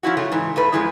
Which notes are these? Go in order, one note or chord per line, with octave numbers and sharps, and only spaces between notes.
F3 C#4 E4 F#4
C#3 F#3 A3 F4
G#2 E3
E2 A3 B4
F#2 B2 F3 G#3 D4 E4